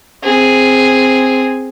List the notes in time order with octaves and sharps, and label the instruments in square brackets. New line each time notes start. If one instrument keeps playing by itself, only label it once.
[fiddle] C4 G#4